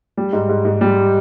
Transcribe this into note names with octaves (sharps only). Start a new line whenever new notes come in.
G3
G#2
G#2
G#2
G3